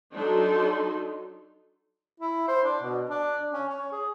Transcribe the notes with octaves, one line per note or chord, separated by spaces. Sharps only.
F#3 D4 D#4 A4 C6
E4
C5
D4
B2
D4
C#4
C#5
G#4